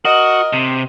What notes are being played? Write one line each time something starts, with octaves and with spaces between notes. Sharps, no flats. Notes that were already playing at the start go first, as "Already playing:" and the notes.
F#4 A#4 D#5
C3